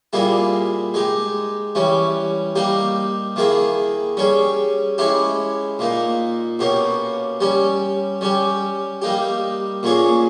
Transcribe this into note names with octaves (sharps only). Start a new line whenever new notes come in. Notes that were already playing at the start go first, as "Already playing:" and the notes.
A#2 G3 A#3 E4 G#4
G#3 D#4 G4
E3 G3 C#4
G3 A#3 D#4 G4
D#3 A#3 E4 G#4
G3 C#4 G#4
G#3 C#4 E4 G4
A#2 A#3 D#4
B2 A#3 C#4 G4
G3 C#4 G4
G3 C#4 G4
G3 A#3 D#4 G4
A#2 A#3 C#4 G#4